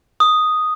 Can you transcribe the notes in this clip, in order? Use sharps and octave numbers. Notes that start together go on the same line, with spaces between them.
D#6